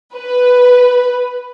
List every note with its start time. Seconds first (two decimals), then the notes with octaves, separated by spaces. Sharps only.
0.15 B4